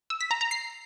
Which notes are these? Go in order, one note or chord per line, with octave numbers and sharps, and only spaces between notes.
E6
B6
A#5
A#5
C7